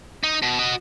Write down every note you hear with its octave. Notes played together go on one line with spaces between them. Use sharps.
D#4
B2
F#4 D#5